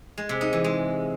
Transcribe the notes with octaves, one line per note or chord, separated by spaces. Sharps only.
G#3
C3
D#4
E3
G#3